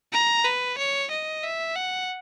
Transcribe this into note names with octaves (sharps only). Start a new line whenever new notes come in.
A#5
B4
C#5
D#5
E5
F#5